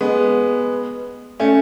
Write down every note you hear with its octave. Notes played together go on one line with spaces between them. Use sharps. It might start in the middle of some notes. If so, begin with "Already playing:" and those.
G#3 B3
A3 C#4